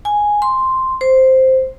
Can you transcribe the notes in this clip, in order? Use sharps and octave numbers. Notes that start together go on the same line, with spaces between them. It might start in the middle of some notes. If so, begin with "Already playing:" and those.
G#5
C6
C5